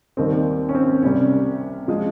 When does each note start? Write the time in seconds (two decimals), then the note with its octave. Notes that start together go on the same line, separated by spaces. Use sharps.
0.17 D#2 D#3 G3 C4
0.69 C#4
0.75 C4
1.03 C2 C3 G3 C#4
1.88 F3 G#3